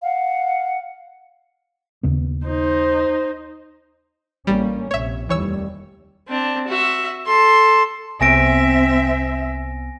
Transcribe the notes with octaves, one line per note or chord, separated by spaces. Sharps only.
F5 F#5
D#2 C#3 B3
D#4 C5
A1 G3 A#3 C#4
A#1 C3 C#5 E5
F1 D#2 E3 G3 C#5 E6
C4 D4
F#4 E5
A4 C6
C2 C3 B3 C4 E5 G#5 A#6 D7